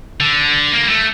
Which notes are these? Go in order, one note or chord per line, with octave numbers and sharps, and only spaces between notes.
D3
A#3
G3
A3